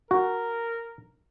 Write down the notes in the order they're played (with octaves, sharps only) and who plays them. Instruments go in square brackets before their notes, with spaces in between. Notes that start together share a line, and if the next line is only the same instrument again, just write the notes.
[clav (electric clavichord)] F#4 [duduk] A#4